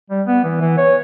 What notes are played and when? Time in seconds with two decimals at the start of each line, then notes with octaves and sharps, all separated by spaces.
0.10 G3
0.27 B3
0.44 E3
0.61 E3
0.78 C#5